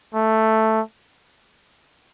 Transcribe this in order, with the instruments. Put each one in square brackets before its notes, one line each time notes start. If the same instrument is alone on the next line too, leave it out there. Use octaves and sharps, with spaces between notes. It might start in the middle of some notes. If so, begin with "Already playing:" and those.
[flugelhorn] A3